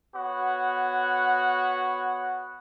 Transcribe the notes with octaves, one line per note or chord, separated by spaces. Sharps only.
B3 F#4 C#5 F#5